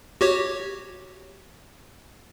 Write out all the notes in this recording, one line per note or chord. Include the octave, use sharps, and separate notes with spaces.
F#4 G4 C#5